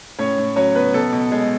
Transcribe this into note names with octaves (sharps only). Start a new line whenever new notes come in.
A2 C#4 C#5
A2
F#3 C#4 C#5
B3 B4
B2 A4
B2
G#3